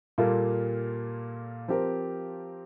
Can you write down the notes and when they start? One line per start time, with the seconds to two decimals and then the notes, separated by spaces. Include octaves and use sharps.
0.18 A#2 G3 A#3 F4 A4
1.68 F3 C4 G4 A#4